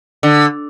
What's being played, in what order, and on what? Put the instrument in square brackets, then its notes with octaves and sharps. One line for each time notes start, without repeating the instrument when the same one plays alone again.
[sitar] D3